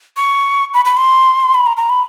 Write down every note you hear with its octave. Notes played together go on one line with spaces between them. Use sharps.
C#6
B5
B5
C6
B5
A#5
A#5
B5